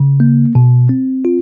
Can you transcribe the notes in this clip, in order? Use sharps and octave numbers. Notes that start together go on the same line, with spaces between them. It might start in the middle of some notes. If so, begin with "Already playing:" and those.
Already playing: C#3
A#3
B2
C4
F4